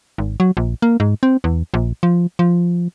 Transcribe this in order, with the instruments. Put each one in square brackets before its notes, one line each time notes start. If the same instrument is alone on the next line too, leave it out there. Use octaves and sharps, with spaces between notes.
[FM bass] G#1
F#3
A#1
A#3
G#2
C4
E2
A#1
F3
F3